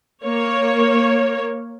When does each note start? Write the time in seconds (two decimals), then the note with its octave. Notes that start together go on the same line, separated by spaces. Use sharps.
0.24 A#3 C#5